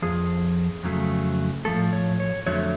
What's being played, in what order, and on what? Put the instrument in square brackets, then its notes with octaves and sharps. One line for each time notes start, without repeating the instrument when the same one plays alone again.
[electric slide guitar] F2 F3 G#4
F2 C#3 F#3 A3
A2 F3 A3 A4
C#5
C#5
F2 D3 F#3 A3 C#5